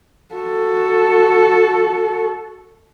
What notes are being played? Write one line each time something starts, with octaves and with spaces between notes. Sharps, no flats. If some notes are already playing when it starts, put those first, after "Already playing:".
F#4 A4